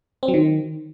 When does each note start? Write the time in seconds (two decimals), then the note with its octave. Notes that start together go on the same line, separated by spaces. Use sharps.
0.23 C4
0.28 F#3
0.34 D#3